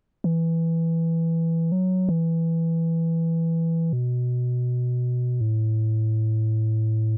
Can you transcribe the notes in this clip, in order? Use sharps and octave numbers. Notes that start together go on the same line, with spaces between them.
E3
F#3
E3
B2
A2